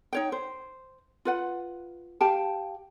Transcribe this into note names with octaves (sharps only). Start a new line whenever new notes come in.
D#4 C#5 G5
C5
F4 B4 F#5
G4 F5 G5 A5